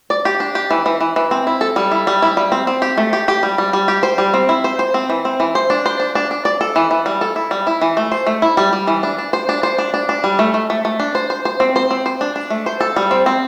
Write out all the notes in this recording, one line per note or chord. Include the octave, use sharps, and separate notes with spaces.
D5
G4
D4
G4
E3
E3
E3
E3
C4
E4
A4
G3
E4
G3
E4
G3
C4
C4
G4
A3
G4
G4
G3
G3
G3
G4
C5
G3
C4
E4
C5
C5
C4
E3
C4
E3
C5
D4
C5
D4
D4
D4
D5
A4
E3
E3
G3
A4
E4
G3
E4
E3
A3
C5
A3
E4
G3
G3
E3
D4
D4
C5
D4
C5
D4
D4
D4
G3
A3
A3
A3
A3
D4
C5
C5
C5
C4
C5
C4
C5
D4
D4
A3
C5
A4
G3
C4
C4